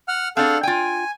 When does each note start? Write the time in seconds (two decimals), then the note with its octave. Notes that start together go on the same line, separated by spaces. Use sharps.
0.08 F#5 F6
0.37 C4 D4 G#4 A4 F5 F#5
0.63 F4 G5 G#5